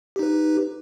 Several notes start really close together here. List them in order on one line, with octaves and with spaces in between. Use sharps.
G4 D#4 B4